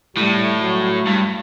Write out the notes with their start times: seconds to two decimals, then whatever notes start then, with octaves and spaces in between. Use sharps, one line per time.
0.16 A2 G3
0.61 F#3
1.07 G2